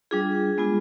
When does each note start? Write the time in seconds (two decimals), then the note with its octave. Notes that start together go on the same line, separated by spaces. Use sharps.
0.11 G3 D4 F4 G#4
0.58 G#3 B3 F4